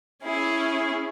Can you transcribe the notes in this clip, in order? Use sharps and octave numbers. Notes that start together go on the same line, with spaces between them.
C#4 E4 G#4